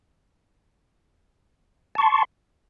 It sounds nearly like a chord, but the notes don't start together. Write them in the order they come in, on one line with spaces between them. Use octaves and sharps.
A5 C#6 C6